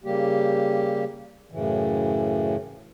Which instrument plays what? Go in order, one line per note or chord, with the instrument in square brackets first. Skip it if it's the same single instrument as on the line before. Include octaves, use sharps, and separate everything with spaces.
[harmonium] C#3 G3 A#3 G4
F#2 A2 C#3 E3